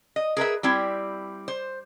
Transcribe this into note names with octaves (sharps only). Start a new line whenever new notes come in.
D#5
G#4 A#4 B4 E5
G3 C4 E4
C5